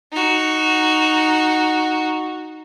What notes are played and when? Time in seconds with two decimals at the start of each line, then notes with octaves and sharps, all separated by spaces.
0.12 D#4 F#4